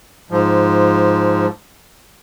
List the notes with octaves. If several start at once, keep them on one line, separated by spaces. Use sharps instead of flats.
G#2 F3